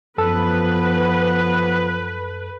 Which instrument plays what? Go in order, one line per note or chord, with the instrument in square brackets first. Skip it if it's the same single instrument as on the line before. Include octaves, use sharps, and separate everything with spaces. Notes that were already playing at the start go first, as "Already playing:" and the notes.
[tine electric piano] F#2 A4 [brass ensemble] F3 B3 [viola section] B4